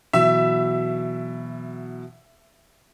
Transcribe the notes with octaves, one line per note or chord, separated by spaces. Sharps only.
B2 E3 F#3 E5